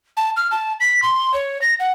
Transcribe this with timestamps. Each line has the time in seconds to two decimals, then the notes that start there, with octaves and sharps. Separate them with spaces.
0.17 A5
0.37 F6
0.51 A5
0.80 B6
1.02 C6
1.34 C#5
1.62 A#6
1.80 F#5